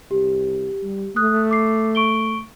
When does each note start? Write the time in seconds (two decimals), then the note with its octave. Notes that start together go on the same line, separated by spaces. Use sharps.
0.11 C2 G4
0.83 G3
1.16 A3 D#6 F#6
1.51 D6 C7
1.95 C#6 D7 G7